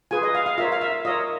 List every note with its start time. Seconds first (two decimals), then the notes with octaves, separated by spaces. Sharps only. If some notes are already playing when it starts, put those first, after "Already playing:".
0.11 F4 G#4 B4 G#5
0.23 D#5
0.35 F5
0.46 F5
0.58 F4 A#4 C#5 E5
0.72 F5
0.81 E5
1.05 F4 A#4 C#5 D#5